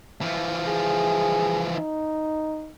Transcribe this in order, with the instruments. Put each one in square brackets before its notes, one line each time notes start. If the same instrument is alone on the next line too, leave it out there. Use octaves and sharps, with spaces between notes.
[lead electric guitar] E3 F3
[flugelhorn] G#4
D#4